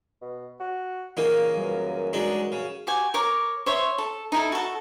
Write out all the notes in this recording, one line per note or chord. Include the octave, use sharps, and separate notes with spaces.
B2
F#4
A#2 C#3 E3 A#3 D#4 F4 A#4
F#2 G3 B4
G#3 D4 D#4 F#4 G#4
C#3
F#4 G4 G#5
A#4 C#5 D6
C5 C#5 E5
A4
D#4 E4 A4
F#4 A4